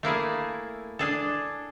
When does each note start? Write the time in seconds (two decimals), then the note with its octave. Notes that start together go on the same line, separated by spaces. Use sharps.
0.03 A3 A#3 E4 G#4
0.99 D4 G#4 A4